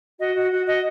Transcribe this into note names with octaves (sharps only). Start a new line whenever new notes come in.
F#4 D#5
F#4
F#4
F#4 D#5